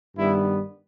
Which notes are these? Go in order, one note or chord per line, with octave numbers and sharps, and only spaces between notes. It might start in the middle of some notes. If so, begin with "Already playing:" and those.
G2 D#3 G3 B3 E4